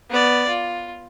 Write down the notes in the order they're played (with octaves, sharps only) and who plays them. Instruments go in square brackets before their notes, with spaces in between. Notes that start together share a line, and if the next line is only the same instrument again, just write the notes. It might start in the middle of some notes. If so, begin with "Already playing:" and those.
[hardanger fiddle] B3 D5
F4